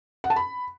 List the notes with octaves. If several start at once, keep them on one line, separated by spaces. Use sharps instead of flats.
F#5
A5
B5